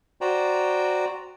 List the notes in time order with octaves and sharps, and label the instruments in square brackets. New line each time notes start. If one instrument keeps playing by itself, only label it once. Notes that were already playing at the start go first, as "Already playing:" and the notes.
[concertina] F#4 C5 D5 G5 A#5